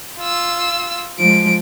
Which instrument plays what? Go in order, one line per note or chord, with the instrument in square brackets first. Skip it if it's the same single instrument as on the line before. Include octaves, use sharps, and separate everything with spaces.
[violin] F4 E6
[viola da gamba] F3 G#3 [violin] D7